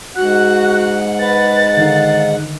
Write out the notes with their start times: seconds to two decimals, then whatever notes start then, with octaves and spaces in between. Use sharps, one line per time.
0.16 G#2 F#4 F#5 F#6
1.19 B4 A6
1.77 D3 D#3 D#4 F5